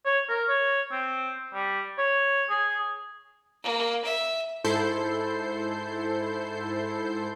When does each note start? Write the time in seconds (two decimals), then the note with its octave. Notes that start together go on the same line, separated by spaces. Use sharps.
0.05 C#5
0.29 A#4
0.48 C#5
0.92 C4
1.53 G3
1.98 C#5
2.50 G#4
3.63 A#3
4.04 E5
4.64 G#2 E4 A4 C5 G6 C7